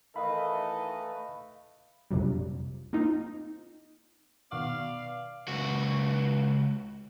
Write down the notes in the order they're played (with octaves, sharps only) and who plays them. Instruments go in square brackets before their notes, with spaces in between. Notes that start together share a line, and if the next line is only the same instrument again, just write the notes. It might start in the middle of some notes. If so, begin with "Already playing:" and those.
[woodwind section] D#3 E3 [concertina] A3 B4 [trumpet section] A4 D#5 [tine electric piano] F5 B5
[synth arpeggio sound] A#1 F2 C3 F#3 G3
A#3 C4 D#4 F4
[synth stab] B2 D#3 F#4 [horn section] B3 D5 F5
[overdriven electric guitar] C#2 F#4